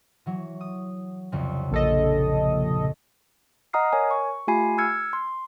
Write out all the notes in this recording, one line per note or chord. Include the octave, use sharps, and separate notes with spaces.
E3 F#3
D#6
C2 F2 C#3
A#1 A4 D#5
D#5 F#5 A#5 D#6 F6 C7
A#4 C#5 G#5
C#6
A3 F4 G4 G#5 B5 C7
E6 F6 G#6 C#7
C6